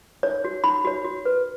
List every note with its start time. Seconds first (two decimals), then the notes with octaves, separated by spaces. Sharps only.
0.23 D#4 C#5
0.44 F#4 C#5
0.64 D#4 B5
0.85 F#4 C#5
1.04 F#4
1.25 B4